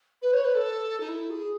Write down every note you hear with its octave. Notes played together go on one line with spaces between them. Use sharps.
B4
C#5
B4
A4
D#4
E4
G#4